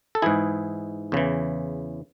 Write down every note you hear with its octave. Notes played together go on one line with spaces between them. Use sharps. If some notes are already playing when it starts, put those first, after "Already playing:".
A4
G#2 E3 E4 G#4
E2 C#3 E3